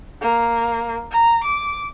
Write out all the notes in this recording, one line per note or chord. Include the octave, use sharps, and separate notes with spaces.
A#3
A#5
D6